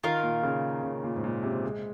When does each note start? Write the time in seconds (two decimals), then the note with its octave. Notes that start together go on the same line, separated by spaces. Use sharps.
0.04 D#3 F4 A#4 F5
0.24 A#2
0.43 C#3
0.83 C#3
1.04 A#2
1.16 G#2
1.24 A#2
1.43 C3
1.64 G#3